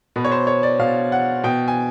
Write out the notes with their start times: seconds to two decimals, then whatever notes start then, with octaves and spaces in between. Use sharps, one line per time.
0.16 B2 B4
0.25 C#5
0.32 C5
0.47 C#5
0.63 D5
0.79 B2 F5
1.12 F#5
1.44 B2 G5
1.68 G#5